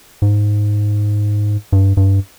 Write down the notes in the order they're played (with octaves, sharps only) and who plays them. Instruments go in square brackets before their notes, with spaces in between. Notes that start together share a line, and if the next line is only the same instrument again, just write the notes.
[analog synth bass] G#2
G2
G2